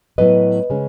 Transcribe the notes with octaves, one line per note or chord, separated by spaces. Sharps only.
A2 F#3 B3 E4 B4 D#5
C#3 G#3 C#4